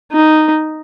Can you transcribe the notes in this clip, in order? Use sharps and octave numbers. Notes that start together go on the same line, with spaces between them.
D#4